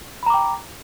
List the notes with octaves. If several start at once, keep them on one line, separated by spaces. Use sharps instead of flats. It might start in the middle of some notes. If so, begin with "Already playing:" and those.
G5 A#5 B5 D6